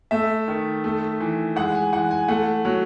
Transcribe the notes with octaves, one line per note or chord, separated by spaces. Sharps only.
A3 E5
D#3
A3
E3
G#3 F#5
G#5
E3 F#5
G#5
A3 F#5
F#3